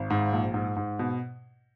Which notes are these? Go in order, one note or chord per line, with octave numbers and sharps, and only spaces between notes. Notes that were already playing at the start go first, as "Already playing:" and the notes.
Already playing: G#1
G#2
A#1
G#2
G#2
B2